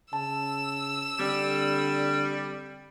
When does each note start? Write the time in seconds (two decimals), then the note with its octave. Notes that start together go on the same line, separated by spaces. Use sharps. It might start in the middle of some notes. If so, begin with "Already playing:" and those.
0.13 C#3 A5 E6
1.19 D3 G3 C4